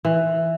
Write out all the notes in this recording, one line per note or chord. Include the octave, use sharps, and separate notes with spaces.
E3